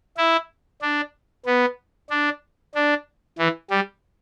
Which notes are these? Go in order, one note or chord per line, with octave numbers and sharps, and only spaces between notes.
E4
D4
B3
D4
D4
E3
G3